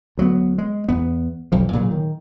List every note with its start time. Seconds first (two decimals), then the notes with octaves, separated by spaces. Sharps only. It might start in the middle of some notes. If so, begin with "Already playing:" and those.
0.17 D2 F#3 G3 B3
0.58 G#3
0.88 E2 B3
1.52 B1 F2 F3
1.73 A#2 C#3 F#3
1.91 D#3